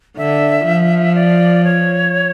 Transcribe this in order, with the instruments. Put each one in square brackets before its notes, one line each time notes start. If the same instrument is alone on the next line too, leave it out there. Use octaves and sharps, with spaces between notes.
[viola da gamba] D3 [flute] E5
[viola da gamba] F3
[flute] D5
C#5